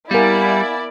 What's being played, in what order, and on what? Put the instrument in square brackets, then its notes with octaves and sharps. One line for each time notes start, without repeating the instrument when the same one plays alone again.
[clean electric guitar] G3 [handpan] B3 A#4 [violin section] E4 D5 [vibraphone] F5 F#5 G#5